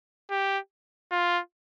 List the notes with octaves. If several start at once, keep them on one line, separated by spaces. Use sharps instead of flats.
G4
F4